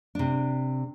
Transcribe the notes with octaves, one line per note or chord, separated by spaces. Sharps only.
C3 D4